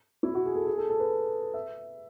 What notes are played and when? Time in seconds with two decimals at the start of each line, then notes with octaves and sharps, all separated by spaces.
0.23 E4
0.35 F#4
0.46 G#4
0.55 A4
0.66 G#4
0.78 A4
0.89 A4
1.00 B4
1.54 E5